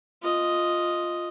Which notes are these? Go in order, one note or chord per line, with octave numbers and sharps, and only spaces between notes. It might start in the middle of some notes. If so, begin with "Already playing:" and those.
F4 D#5